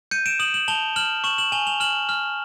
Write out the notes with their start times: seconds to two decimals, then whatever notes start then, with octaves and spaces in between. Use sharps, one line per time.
0.11 G6 C#7 D#7
0.26 D7 E7
0.39 D#6 E7 F#7
0.54 E7 F#7
0.68 A5 F7 G7
0.96 F6 E7 F#7
1.24 C#6 E7 F#7
1.38 E7 F#7
1.52 G#5 F7 G7
1.67 F7 G7
1.80 F6 E7 F#7
2.09 F6